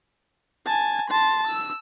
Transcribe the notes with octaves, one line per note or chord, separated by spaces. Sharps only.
G#5 A5
A5 C6
E6